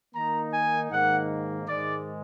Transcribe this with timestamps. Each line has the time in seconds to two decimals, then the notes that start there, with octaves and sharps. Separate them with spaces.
0.14 D#3 A#3 D#4 A#5
0.53 G#5
0.91 G#2 D#3 A#3 F#5
1.68 G#2 D#3 G#3 D5